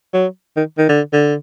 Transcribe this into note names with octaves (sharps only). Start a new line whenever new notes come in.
F#3
D#3
D#3
D3
D3